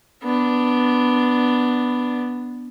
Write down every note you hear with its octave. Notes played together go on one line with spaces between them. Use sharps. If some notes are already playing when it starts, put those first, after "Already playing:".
B3 D4